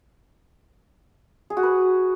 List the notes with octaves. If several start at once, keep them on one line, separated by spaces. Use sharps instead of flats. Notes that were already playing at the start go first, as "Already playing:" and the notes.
G#4
F#4
B4